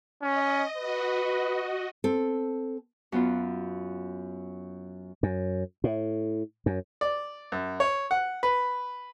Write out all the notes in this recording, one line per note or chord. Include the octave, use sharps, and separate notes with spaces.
C#4 D#5
F#4 B4 D#5
C4 A4
F#2 B3 F4
F#2
A2
F#2
D5
F#2
C#5
F#5
B4